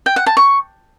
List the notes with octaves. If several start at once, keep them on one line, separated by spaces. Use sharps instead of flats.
G5
F#5
A5
C#6